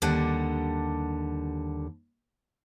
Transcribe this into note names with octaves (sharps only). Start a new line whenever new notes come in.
D#2 D3 G3 D4 F#5